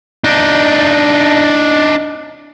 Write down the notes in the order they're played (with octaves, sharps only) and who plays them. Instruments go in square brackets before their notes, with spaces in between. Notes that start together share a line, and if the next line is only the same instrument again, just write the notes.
[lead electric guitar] D4 D#4